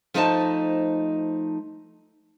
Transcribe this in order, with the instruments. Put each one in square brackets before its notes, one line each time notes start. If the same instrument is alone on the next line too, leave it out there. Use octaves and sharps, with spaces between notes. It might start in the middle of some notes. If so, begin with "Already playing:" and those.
[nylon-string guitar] F3 A3 D#4 C5 D#5 A5